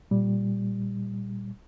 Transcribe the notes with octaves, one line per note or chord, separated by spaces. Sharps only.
A#2 G3